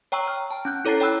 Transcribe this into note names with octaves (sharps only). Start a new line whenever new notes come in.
C#5 G5 A#5 C#6 E6
F6
A5
C#4 F#6 G6
E4 A4 C#5 A#5 A6 C7
C#5 G5 B5 E6 F#6